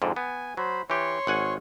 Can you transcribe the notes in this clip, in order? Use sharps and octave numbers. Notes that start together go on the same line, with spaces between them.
F2 G#2 D3
B3 G#5
F#3 C5 B5
E3 G4 C#5 C6 C#6
G#1 F#5 G#5